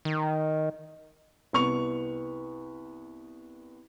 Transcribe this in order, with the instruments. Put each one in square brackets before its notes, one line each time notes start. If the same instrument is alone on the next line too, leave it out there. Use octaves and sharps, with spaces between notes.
[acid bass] D#3
[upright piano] C2 B3 C#6 F7